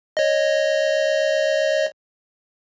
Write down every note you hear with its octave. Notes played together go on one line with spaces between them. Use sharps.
C#5 D#5